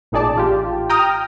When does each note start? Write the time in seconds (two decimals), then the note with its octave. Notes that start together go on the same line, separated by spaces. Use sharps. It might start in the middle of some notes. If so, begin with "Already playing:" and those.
0.12 A1 A#2 D#4 G#4 D5 A5
0.36 A1 F4 G4
0.90 G5 A#5 D#6 F6